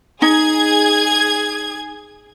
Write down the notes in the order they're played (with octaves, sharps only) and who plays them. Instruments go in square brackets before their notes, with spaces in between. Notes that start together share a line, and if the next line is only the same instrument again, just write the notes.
[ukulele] D#4 [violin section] G#4 G#6